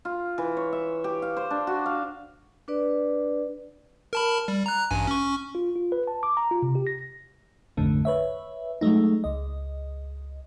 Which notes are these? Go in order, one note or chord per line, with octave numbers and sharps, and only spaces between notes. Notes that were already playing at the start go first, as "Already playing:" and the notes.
F4
E3
C#5
E5
G4
F5
C5
D4
F#4
F5
D4 B4 D5
A#4 A5 B5
G3
A#5 F#6
A1 G2 G#5
C#4 C#6
F4
F4
B4
A5
D6
A#5
F4
C3
G4
A#6
A#1 F2 G#2 D3 A3
B4 C#5 E5
F#3 G#3 A3 D#4
C#2 D#5